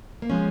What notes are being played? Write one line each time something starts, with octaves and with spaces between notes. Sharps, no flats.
A#3
F3 G#3 C#4